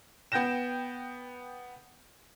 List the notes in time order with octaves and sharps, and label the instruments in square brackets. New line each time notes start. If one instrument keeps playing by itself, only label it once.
[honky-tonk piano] B3 G5 G6 A#6 E7